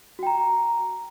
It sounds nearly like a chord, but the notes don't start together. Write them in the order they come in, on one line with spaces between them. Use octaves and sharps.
F#4 G5 A#5